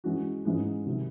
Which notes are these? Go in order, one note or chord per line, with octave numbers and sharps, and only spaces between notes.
E3 G#3 C#4 F#4
G#2 E3 G#3 C#4
C3 D#3 F#3